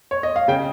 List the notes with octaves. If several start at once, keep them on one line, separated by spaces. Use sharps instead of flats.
C#5
D#5
F5
C#3 G5